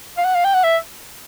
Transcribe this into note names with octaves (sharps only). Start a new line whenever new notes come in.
F5
F#5
F5
G5
F#5
E5